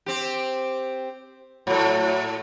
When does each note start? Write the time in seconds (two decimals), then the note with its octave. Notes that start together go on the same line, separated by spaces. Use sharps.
0.06 C4 G4
1.67 A2 F#3 A3